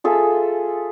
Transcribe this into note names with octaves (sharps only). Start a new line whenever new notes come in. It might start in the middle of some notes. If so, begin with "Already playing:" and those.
F4 G#4 A4 E5